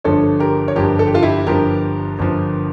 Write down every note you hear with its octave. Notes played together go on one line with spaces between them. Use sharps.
G1 G2 F3 A4 C#5
G4 A#4
C#5
G1 G2 F3 G4 A#4
A4
G4
F4 A4
E4 G4
G1 G2 F3 G4 A#4
G1 G2 F3